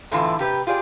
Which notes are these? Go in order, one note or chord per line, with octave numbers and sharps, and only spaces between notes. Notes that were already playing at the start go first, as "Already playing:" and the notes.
E2 A2 D3 E3 F4
C3 G4 B4
F4 G4 G#4 D5